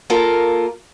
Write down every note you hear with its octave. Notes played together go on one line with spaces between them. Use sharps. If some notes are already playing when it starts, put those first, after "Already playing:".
A#3 F4 A4 A#4